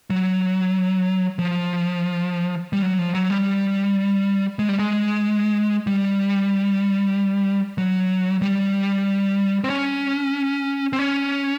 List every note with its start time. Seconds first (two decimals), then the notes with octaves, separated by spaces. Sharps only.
0.10 F#3
1.39 F3
2.73 G3
2.82 F#3
2.98 F3
3.14 F#3
3.30 G3
4.59 G#3
4.69 G3
4.79 G#3
5.87 G3
7.78 F#3
8.42 G3
9.64 C4
9.70 C#4
10.93 C4
10.99 C#4